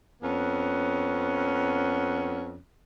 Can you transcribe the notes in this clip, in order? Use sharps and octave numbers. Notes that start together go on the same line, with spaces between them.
F2 B3 C#4